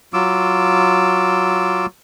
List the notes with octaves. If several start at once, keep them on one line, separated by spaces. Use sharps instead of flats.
F#3 F4 D6 E6